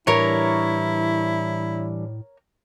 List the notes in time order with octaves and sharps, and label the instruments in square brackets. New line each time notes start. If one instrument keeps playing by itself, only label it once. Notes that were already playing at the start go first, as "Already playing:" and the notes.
[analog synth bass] A2 [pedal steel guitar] E3 G3 D4 [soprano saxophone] E4 [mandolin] A#4 C#5